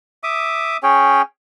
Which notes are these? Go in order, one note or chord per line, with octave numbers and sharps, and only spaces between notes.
E5 D6 D#6
C#4 G#4 C#5 G5